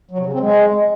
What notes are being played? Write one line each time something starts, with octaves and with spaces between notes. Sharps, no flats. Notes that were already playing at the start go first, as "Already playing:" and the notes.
F#3
C3
C#3
C4
G#3